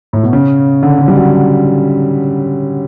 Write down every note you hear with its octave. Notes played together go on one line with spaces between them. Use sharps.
A2
B2
C#3
D3
D3
G3
F#3